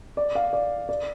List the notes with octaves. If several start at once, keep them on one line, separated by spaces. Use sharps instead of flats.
D5
F5
D5
D5